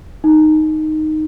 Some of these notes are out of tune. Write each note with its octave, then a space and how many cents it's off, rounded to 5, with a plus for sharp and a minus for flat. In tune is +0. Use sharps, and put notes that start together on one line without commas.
D#4 -5